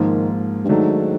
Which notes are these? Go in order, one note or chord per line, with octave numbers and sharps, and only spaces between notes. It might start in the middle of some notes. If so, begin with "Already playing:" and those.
Already playing: G#2 D#3 F3 A#3
G2
G#2 D#3 F#3 A3 D4